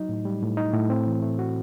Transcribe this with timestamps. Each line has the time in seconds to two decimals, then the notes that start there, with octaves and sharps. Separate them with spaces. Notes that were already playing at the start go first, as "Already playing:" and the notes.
Already playing: F#3 D#4
0.09 A2
0.25 G3
0.42 A2
0.57 D#4
0.73 A2
0.90 C4
1.07 E3
1.22 A3
1.39 F#4